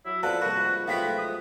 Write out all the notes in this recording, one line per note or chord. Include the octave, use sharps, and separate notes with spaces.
F#3 E4
F3 B3 C4 A4 D5 F5 F#5 A5
C2 G#2 F3 A#3 F#4 B5
F#3 A3 B3 F4 D5 G5 B6
D#6